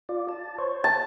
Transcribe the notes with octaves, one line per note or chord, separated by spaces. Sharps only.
F4 D5
A5
C5 C#5
A5